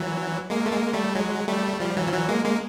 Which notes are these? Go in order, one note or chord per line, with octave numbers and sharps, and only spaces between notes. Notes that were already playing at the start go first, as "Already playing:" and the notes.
Already playing: E3 F#3
G#3 A#3
A3
G#3 A#3
G3 A3
F#3 G#3
G3 A3
F3 G3
E3 F#3
F3
E3 F#3
G#3 A#3
G#3 A#3